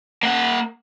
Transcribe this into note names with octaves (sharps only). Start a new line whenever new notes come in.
A#3 F#5